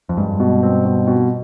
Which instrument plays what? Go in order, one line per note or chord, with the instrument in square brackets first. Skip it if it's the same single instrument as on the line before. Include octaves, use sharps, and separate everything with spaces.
[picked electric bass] F2
[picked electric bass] G2 [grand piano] G#3
[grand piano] B2
C4
B2
B2